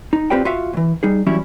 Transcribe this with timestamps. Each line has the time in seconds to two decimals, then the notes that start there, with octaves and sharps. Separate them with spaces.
0.13 D#4
0.30 C4 F4 G4 B4 D5 G5
0.45 F4 F#4 E5 F5
0.73 D2 E3
1.03 G3 D#4 G#4
1.26 E3 F#3 G3 C#4 E4